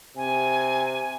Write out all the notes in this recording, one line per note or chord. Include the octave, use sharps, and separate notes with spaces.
C3 G#5